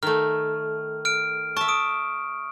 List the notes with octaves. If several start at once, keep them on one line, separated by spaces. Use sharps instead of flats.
D#3 A3 F6
F6 D7
E5 A5 C#6
D#6 D7